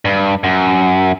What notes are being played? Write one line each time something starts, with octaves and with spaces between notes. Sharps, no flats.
G2
F#2